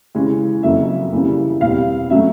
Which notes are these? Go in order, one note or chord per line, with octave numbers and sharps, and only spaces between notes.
C#3 E3 G#3 C#4
F2 C#3 F#3 A#3 E5
C#3 E3 G3 A#3
E2 B2 G3 C4 F5
D3 F#3 A3 C#4 E5